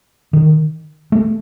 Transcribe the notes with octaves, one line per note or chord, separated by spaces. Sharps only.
D#3
A3